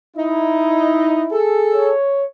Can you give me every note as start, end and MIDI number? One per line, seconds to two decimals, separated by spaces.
0.17 1.25 63
0.17 1.34 64
1.32 1.92 68
1.32 1.92 69
1.73 2.25 73